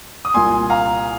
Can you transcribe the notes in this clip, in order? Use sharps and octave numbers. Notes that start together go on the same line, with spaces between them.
D#6
C2 A#2 A#3 G#5 C6
F5 A#5